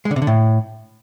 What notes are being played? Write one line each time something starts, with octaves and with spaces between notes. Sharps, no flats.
G#3
D3
C3
D3
A2